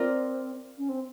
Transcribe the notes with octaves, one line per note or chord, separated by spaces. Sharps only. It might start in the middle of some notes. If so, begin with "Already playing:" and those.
Already playing: C4 F4 A#4 D5
C#4
C4